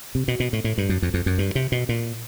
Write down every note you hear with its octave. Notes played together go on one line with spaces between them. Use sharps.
C3
B2
B2
A2
A2
G2
F#2
F2
F2
F#2
G2
C3
B2
A#2